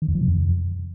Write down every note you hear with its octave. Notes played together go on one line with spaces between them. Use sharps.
D#3
E2
F3
C3
F2